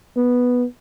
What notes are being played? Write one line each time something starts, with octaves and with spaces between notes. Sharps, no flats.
B3